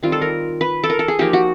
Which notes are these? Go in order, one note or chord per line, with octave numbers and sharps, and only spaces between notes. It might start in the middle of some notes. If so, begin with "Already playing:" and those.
D#3 G3 C4 F4
A4
A#4
B4
A4
A#4
A4
G#4
F3 A#3 D#4 G4
F#4